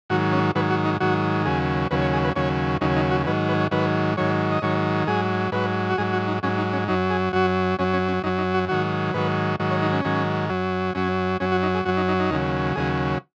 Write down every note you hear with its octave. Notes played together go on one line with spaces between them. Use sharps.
G#2 D#3 F#3 F#4
C#4
G#2 D#3 F#3 B4
F#4
D#4
G#2 D#3 F#3 F#4
D#2 C#3 F#3 G#4
D#2 C#3 F#3 B4
C#5
G#4
B4
D#2 C#3 F#3 C#5
D#2 C#3 F#3 D#4
D#4
F#4
G#2 D#3 F#3 B4
B4
C#5
G#2 D#3 F#3 B4
G#2 D#3 F#3 C#5
D#5
G#2 D#3 F#3 C#5
G#2 F#3 G#4
G#2 F#3 B4
F#4
G#2 F#3 G#4
F#4
D#4
G#2 F#3 C#4
D#4
C#4
F#2 F#3 D#4
G#4
F#2 F#3 F#4
F#2 F#3 C#4
C#4
C#4
F#2 F#3 D#4
D#4
F#4
G#2 D#3 F#3 F#4
G#2 D#3 F#3 B4
G#2 D#3 F#3
C#5
D#4
C#4
G#2 D#3 F#3
F#2 F#3
F#2 F#3 C#4
F#2 F#3 C#4
F#4
D#4
G#4
F#2 F#3 F#4
D#4
D#4
D#4
D#2 C#3 F#3
D#2 C#3 F#3 G#4